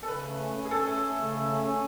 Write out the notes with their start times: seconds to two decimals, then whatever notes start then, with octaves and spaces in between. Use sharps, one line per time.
0.03 A4
0.08 C#3 B4
0.24 A3
0.40 C#4
0.55 C#4
0.65 G#4
0.71 C#4 A4
0.86 A3
1.02 A3
1.18 C#3
1.34 A3
1.50 C#4
1.65 C#4